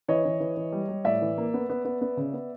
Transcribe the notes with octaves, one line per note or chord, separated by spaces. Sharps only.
E3 C#5 D#5
E3
E3
E3
G3
G3
A2 D5 E5
E3
A#3
B3
B3
B3
B3
C#3
B3